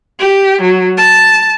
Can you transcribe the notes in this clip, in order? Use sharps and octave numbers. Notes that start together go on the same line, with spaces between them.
G4
F#3
A5